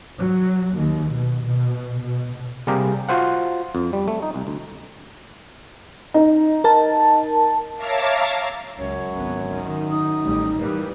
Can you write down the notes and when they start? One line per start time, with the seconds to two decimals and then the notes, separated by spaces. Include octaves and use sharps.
0.19 F#3
0.75 D#2
1.12 B2
1.44 B2
2.00 B2
2.67 C3 G3 A#3 G4 G#4 A#4
3.09 F4 F#4 C5 F#5
3.75 F2
3.93 G3
4.08 A3
4.22 D#4
4.34 C2
4.47 D2
6.14 D#4
6.64 A#4 A5
7.76 C#5 E5 F5 A5 A#5 D6
8.78 C#2 F#2 C#5
9.13 G#1 C#2 B3
9.45 D#3
9.91 D#4 D#6
10.23 A1 G3
10.59 E3 G3 A#3 A#4 B4